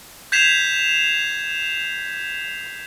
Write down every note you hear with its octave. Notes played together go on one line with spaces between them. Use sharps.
G6 G#6 B6 C7 E7 F7